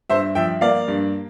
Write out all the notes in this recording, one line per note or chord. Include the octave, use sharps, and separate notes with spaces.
G2 C5 E5
F3 E5 G5
A#3 D5 F5
G2